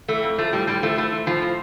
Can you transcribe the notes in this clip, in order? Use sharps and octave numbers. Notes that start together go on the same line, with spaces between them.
E3 A3
F2
F3 A3
A2 G3
A2 G3
F3 A3
A2 A3
E3
A2 F3
A2